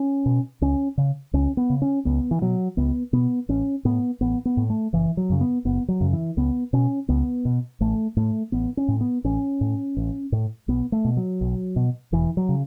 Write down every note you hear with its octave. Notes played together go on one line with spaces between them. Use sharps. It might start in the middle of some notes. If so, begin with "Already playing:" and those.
Already playing: C#4
B2
C#2 C#4
C#3
C#2 C#4
B3
C#3
C#4
C#2 B3
E3
B2 F#3
C#2 B3
B2 B3
A1 C#4
A2 B3
A1 B3
B3
A2
A3
F#1 E3
F#3
F#2 C#3
B3
F#1 B3
F#3
F#2 C#3
E3
C#2 B3
B2 C#4
C#2 B3
B2
A1 A3
A2 A3
A1 B3
C#4
A2
B3
A1 C#4
A2
A1
A2
B1 B3
A3
B2
F#3
B1
B2
E1 E3
F#3
C#3